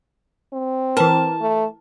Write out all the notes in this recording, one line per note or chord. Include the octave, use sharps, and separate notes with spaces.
C4
E3 A#4 A5
A3